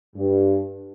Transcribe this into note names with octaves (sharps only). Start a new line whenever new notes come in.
G2